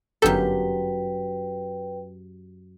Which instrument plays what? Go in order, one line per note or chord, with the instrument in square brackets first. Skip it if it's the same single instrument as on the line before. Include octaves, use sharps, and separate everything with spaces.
[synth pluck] G1 A4 [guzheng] F#2 G4 [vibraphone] B4 G5